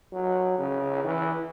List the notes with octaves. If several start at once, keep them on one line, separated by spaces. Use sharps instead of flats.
F#3
C#3
E3